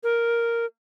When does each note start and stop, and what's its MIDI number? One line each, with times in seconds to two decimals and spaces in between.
0.04 0.65 70